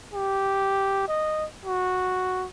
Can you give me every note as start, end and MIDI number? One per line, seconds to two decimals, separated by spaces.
0.14 1.06 67
1.08 1.46 75
1.65 2.46 66